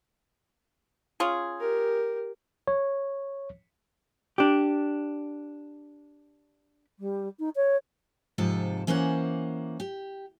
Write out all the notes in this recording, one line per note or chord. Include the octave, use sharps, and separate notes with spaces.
C#4 F4 G#4
G4 A#4
C#5
D4 G4
G3
D#4
C#5
G#2 C3 F3 A4 A5
E3 A#3 C#4 C5 F#5
G4